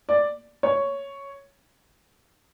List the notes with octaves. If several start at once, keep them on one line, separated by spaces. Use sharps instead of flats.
D5
C#5